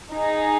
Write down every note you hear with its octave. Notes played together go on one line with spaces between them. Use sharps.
D#4 G#4